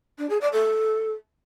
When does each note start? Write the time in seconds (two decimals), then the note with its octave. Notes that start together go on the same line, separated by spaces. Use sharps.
0.18 D4
0.29 G#4
0.41 D5
0.52 A4